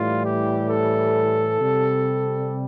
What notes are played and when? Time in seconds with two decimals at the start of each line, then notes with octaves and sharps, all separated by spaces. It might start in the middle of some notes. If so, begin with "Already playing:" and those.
Already playing: A2 E3 G3 F4
0.24 G4
0.68 A4
1.59 C3 G3